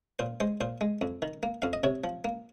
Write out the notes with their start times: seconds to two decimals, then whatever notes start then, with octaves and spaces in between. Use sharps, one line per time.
0.19 A#2 C5
0.40 G#3 C5
0.61 A#2 C5
0.81 G#3
1.01 F2
1.22 D#3
1.43 A#3
1.62 F2 F5
1.73 D#5
1.84 C3 C#5
2.04 F3
2.25 A#3